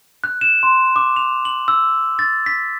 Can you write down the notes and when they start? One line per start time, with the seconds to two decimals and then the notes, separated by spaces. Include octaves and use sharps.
0.24 F#6
0.41 E7
0.63 C6
0.96 D6
1.16 F7
1.45 F#7
1.68 E6
2.19 A6
2.46 B6